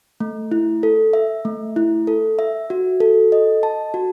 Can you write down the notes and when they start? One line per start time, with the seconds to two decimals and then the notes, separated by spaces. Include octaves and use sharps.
0.20 A3
0.51 E4
0.83 A4
1.13 E5
1.45 A3
1.76 E4
2.07 A4
2.39 E5
2.70 F#4
3.00 A4
3.32 D#5
3.63 A5
3.94 F#4